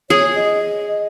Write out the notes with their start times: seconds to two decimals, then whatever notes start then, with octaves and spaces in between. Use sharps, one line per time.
0.10 G#4 C#5
0.35 D#5